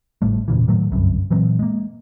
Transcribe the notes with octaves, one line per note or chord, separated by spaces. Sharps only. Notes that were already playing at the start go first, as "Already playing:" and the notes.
G#1 A2 G3 A3
E1 A#2 C#3 E3
A2 D#3 F#3 A3
G1 C2 F#2 C3
A#2 E3 F#3 C4
G#3 A#3